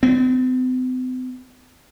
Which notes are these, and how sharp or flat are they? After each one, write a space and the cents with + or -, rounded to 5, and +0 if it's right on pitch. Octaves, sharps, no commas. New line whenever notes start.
C4 -45